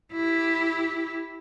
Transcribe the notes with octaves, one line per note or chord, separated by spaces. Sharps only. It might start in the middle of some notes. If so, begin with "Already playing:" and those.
E4 G4